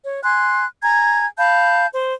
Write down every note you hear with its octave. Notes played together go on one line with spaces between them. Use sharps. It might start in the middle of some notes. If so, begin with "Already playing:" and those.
C#5
G#5 C6 F#6
G#5 A#5 G#6
F5 A5 B5 G6
C5